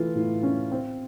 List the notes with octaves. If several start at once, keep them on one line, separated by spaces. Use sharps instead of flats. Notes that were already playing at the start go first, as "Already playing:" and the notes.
Already playing: E3 A3 F4
A2
C#4
C4